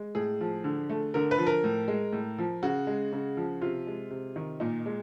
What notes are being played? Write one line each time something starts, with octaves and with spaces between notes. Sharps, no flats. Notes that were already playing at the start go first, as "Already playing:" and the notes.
Already playing: G#3
A2 G#4
F3
D3
A3
D3 A#4
B4
F3
A#4
A2
G#3
A2
F3
C#3 F#4
G#3
C#3
F3
C3 F4
G#3
C3
D#3
A#2 D#4
G#3